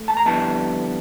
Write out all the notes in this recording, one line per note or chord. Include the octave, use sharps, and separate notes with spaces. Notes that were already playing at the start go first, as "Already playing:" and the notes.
Already playing: A3
A5
A#5
F2 D3 G3 B3 E4 A5